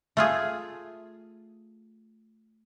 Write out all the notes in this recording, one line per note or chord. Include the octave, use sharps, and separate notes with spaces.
A3 F4 G#4